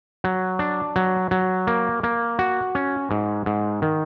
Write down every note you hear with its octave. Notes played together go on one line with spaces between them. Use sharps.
F#3
D4
F#3
F#3
A#3
A#3
F#4
C#4
G#2
G#2
D#3